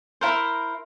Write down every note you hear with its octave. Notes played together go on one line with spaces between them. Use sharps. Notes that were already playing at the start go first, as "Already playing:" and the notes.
E4 A#4 C5